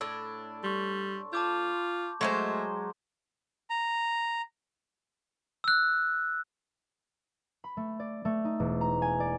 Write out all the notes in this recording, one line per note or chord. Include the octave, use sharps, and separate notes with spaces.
A2 D4 E6
G3 C6 C#6
F4 A5 D6 G6
F#3 G#3 A3 C5 C6
A#5
E6 F#6
B5
A3
D5
A3
D#4
E1
A#5
G#5
D5